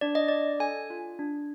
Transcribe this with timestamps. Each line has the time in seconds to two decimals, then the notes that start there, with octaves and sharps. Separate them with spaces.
0.01 D4 D5
0.15 D#5
0.28 D4 D5
0.60 A4 G#5
0.90 F4
1.19 D4